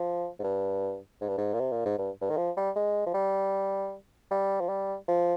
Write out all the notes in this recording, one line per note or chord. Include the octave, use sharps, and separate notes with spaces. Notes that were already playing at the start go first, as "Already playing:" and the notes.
Already playing: F3
G#2
G2
G#2
G2
G#2
A#2
C3
A#2
G#2
G2
G2
D#3
F3
G3
G#3
F3
G3
G3
F3
G3
F3